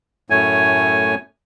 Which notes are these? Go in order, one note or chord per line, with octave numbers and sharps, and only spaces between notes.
F#2 A2 A3 C#5 G#5